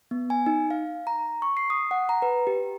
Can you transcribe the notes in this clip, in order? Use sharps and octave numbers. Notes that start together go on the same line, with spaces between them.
B3
G#5
D#4
F5
A#5
C#6
C7
D#6
F#5
A#5
B4
G4